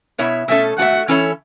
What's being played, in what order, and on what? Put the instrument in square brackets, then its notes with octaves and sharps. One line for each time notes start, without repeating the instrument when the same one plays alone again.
[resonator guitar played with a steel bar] B2 B3 E4 C#5 E5
[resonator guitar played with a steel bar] B2 A3 C#4 A4 [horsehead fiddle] E5
[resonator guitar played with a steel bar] A3 F#4 C#5 E5 [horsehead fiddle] F#5
[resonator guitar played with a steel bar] E3 C#4 E4 A4 C#5